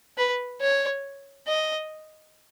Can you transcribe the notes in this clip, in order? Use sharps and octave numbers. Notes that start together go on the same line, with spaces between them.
B4
C#5
D#5